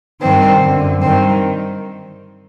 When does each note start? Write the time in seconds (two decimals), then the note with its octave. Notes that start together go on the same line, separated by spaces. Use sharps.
0.21 G2 D#3 C4
0.61 F#2 D3
1.00 G2 D#3 C4